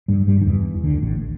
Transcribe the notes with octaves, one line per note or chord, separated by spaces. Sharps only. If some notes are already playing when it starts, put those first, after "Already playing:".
G2 G3
G2 G3
D3
E2 E3
D2 D3
A1 A2